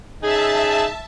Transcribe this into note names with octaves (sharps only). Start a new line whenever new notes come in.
C#3 D#4 G#4 E5 A5